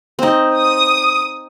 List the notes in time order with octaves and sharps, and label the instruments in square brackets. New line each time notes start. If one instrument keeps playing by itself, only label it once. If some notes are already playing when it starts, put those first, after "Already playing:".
[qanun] C4 D#4
[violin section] D#6